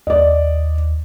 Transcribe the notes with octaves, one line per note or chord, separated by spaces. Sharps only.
D#2 D5 D#5